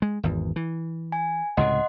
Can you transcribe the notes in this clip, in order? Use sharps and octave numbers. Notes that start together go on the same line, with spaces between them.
G#3
G#1 E2
E3
G#5
C#2 A2 C3 D#5 F#5 C6